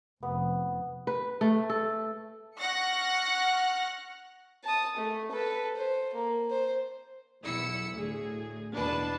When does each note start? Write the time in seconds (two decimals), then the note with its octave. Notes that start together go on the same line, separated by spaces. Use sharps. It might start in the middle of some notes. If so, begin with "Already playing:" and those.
0.23 F1 B3
1.07 B4
1.41 A3
1.70 A4
2.57 F#5 C#6 F6 F#6 A#6 C#7
4.64 A5 D#6
4.97 A3
5.32 A4 B4
5.77 C5
6.14 A#3
6.51 C5
7.43 B1 E2 E4 E6 C#7
7.93 D2 A2 G#4
8.73 E2 B2 D4 B4 A5